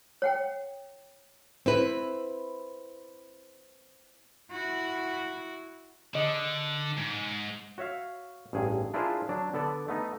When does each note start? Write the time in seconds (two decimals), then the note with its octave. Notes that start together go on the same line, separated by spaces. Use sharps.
0.22 C#5 F#5 G5
1.66 C4 E4 B4
4.51 E4 F#4
6.15 D3 D#5
6.97 G#2
7.78 F#4 C#5 E5 F5
8.53 A1 G2 G#4
8.94 D4 E4 F4 G#4 A#4 C5
9.29 F#3 D4
9.54 D3 B3 A4 D5
9.88 A3 B3 D#4